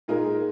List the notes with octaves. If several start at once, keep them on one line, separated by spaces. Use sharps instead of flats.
A#2 G#3 D#4 A#4